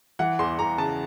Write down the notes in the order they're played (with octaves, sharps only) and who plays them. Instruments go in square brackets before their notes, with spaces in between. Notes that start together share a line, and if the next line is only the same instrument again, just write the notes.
[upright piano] E3 F#5
E2 C6
E2 A#5
C#3 A5